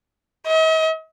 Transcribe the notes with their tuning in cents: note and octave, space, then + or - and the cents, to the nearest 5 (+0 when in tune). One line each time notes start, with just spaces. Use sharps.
D#5 +45